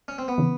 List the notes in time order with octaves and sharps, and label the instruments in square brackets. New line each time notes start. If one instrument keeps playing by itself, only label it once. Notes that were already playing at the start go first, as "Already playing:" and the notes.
[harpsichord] C#4
C4
B3
[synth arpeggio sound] C#3 E3